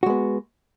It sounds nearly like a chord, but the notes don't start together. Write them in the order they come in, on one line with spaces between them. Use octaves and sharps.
F#4 G#3 B3